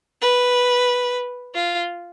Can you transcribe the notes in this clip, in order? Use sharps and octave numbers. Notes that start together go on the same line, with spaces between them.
B4
F4